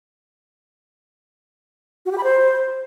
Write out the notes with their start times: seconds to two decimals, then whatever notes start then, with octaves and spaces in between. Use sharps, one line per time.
2.06 F#4
2.12 G4
2.18 B5
2.24 C5